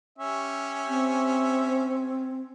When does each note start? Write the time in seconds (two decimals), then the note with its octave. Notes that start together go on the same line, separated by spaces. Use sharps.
0.18 C#4 G4 E5
0.88 C4